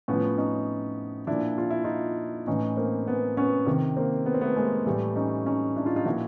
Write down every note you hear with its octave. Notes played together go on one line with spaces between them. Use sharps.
A2 F3 B3 C#4
C#4 D#4
A#2 F3 D4 E4
F4
E4
D#4 F4
A2 E3 C#4 D#4
A#3 C4
B3 C#4
B3 C#4
C3 D#3
A#3 C4
B3
C4
A3 B3
G#3 A#3
A2 E3 G3 A3
C#4 D#4
C#4 D#4
D4 E4
D#4 F4
D#4 F4
A#2 F3 E4 F#4